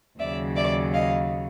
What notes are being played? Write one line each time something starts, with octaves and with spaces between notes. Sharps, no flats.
D#2 C#3 F#3 D5 E5
D5 E5
D#5 F5